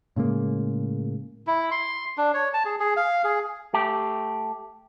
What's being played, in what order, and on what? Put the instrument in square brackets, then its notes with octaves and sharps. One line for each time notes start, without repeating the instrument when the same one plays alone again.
[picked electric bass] A2 C#3 G#3 A#3
[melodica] E4
C6
D4
C#5
A5
G#4
G#4
F5
G#4
[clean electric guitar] A3 G4